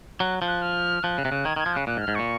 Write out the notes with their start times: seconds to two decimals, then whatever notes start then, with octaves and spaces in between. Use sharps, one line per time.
0.20 F#3 F#6
0.42 F3
0.48 F#6
0.62 F6
1.03 F3 F#6
1.18 C#3
1.25 C3
1.32 C#3
1.45 D#3 G#6
1.56 D#3 G#6
1.66 F3
1.73 C#3 F#6
1.87 A#2 F#6
1.97 G#2
2.01 F6
2.08 G#2
2.15 A#2 C#6